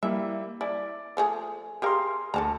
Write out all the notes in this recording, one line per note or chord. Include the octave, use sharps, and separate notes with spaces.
G3 A#3 E4 E5
E4 D5
F3 A3 G#4
G4 G#4 A#4 F5 A#5 C6
D2 A4 A5 A#5